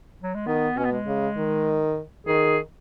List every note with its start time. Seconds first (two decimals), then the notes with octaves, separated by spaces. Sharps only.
0.23 F#3
0.35 G#3
0.47 D#3 B3
0.77 B2 C#4
0.85 B3
0.92 G#3
1.06 C#3
1.37 D#3
2.27 D#3 G#4